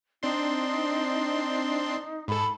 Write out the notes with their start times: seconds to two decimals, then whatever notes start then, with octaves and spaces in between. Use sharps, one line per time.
0.23 C4 D4 D#4 C6
2.28 G#2 A4 B5